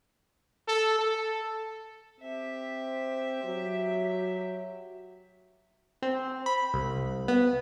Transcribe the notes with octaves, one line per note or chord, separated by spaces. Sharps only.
A4
A4
C4 G4 E5
F#3
C4
B5
C2
B3